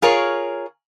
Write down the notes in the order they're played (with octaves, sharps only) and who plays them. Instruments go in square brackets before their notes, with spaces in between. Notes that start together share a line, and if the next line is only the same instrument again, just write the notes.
[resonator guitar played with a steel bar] F4 G#4 A#4 C#5